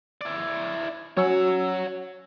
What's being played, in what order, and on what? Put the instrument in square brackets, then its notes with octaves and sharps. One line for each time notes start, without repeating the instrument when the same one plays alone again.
[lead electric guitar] E4 D5
[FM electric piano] F#3 C#4 E6 [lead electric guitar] C#5 F#5